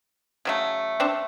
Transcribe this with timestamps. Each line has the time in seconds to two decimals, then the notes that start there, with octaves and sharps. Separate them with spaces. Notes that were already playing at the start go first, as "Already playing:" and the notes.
0.45 C#3 F#3 A3
1.00 C4 D4